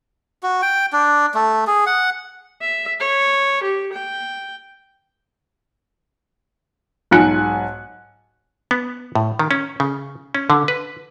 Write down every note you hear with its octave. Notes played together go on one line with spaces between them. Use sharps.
F#4
G5
D4
A3
G#4
F#5
E5
C#5
G4
G5
B1 G#2 G#5 F#6 C#7
B3
A2
D#3
C#4
C#3
C#4
D3
B4